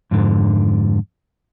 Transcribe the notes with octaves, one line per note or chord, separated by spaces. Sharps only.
F2 G#2 D3